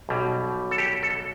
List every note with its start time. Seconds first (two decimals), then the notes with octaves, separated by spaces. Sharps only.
0.09 B1 B2 G3
0.71 A4
0.78 G4
1.03 A4